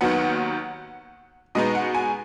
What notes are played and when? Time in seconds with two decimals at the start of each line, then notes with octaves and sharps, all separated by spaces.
0.01 D#2 D#3 F#3 B3 F#5
1.55 B2 G#3 B3 D#4 D#5
1.75 F#5
1.95 G#5